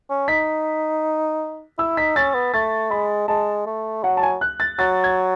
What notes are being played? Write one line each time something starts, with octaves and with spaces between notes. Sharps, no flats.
C#4
D#4 B6
E4 E6
D#4 B6
C#4 A6
B3
A3 A6
G#3 B5
G#3 A5
A3
F#3 F#5
A5
G#5
F#6
A6
F#3 A6
G#6